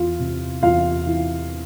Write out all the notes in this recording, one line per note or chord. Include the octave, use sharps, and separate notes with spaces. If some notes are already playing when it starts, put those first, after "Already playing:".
Already playing: E2 F4
C3
E2 F4 F5
E3